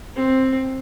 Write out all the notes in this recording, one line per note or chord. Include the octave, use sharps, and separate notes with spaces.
C4